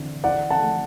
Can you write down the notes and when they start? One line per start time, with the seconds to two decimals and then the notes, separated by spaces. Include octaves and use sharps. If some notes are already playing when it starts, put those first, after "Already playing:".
Already playing: D3 E3 C4
0.24 E3 D5 F#5
0.50 F#5 A5
0.63 A3